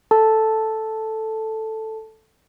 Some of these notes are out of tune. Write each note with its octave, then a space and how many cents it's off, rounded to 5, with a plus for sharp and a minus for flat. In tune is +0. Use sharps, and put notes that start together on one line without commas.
A4 +0 A5 +0